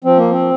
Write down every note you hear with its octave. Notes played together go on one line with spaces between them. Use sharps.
F3 C4
A#3
C4